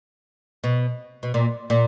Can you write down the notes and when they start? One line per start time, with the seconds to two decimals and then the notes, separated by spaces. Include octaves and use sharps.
0.64 B2
1.23 B2
1.34 A#2
1.70 A#2